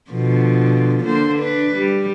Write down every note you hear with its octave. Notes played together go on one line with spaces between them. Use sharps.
B2 D3 F3
D3 A#3 C5
D4 B4
G3